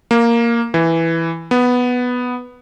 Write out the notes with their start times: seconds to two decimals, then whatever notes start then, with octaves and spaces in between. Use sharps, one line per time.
0.11 A#3
0.74 E3
1.51 B3